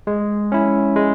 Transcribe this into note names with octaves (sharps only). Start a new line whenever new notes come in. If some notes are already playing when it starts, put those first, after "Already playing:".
G#3
C#4 E4
G#3